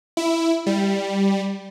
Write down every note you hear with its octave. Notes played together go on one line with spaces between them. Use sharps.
E4
G3